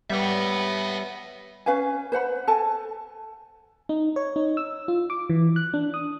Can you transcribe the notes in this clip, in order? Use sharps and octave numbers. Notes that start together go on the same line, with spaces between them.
G3 B3 C#5 E5
C#4 B4 F5 G#5
B4 C5 F#5 B5
A4 G#5 A5
D#4
C#5
D#4
E6
F4
D6
E3
F#6
D4
D#6